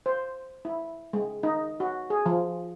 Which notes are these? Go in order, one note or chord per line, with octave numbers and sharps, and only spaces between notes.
C5
E4
G#3
D#4
F#4
G#4
F3